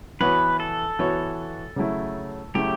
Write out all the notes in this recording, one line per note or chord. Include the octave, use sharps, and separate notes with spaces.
E3 B3 F#4 B4 C#5
A4
E3 B3 F#4 C#5
C#3 F#3 A3 E4
C#3 F#3 A3 E4 G4